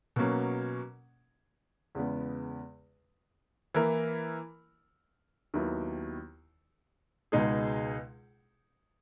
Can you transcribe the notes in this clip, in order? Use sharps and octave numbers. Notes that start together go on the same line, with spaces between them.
B2 F#3 A#3 C#4
E2 C#3 G#3 B3
E3 A#3 E4 A#4
D#2 D#3 F#3 B3 E4
C#2 B2 G#3 D#4 G#4